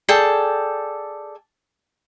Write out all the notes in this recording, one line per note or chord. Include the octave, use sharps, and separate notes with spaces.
G#4 A4 D5 G5